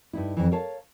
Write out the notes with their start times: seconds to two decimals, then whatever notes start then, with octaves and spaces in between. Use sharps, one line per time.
0.13 G2 D#4 E4
0.37 F2 E3
0.51 A#4 C#5 F5 A5